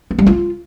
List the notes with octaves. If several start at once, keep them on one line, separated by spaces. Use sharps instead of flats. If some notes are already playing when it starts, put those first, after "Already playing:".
B3
G3
F4